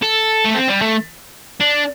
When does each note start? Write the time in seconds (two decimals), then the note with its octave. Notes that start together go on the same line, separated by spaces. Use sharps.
0.03 A4
0.45 A3
0.55 C4
0.69 G3
0.81 A3
1.61 D4